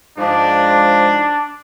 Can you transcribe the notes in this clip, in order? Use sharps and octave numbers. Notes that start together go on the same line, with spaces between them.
G#2 F3 D4